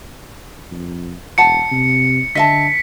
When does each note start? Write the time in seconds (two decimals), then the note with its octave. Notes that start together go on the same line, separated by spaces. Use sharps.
0.71 F2
1.38 E1 F#5 A5 C#7
1.72 C3
2.35 D3 D#5 E5 A5 B6